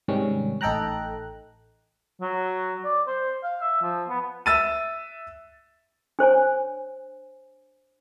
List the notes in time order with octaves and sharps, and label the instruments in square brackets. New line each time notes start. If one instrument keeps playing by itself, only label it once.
[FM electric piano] G#2 C3 D#3 G3 C#4
A1 D#4 A4 G5 A#5 F#6
[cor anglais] F#3
D5
C5
F5
E5
F3
B3
[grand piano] E5 E6 A6 D#7
[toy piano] D4 C5 C#5 G#5